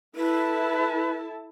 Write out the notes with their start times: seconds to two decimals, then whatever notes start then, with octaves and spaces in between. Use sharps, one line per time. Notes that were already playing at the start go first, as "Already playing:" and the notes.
0.16 E4 A4 B4 A5